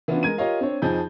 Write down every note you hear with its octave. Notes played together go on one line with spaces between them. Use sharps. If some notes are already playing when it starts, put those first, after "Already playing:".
E3 B3 C#4 D4 F4
G#3 A#4 G#6 D#7
F4 G4 A#4 C#5 D#5 F5
C4 D4 C#5
F2 F3 D#4 G#4 G6